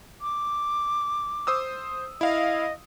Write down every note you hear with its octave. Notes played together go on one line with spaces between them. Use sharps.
D6
C5 D#6 E6
E4 D#5 F5